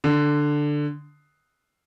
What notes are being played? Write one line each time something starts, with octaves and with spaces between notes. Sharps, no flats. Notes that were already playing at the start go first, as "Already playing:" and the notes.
D3